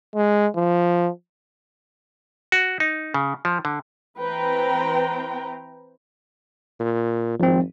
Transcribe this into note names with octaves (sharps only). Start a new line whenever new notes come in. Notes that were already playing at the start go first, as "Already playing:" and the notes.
G#3
F3
F#4
D#4
C#3
F3
D3
E3 C4 B4 C5 G5 A#5
A#2
G#1 F3 C4